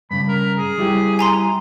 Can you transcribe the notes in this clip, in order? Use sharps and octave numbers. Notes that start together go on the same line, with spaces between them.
G2 C#3 B5
A#4
G#4
G3 E4 G4
G#5 A#5 C6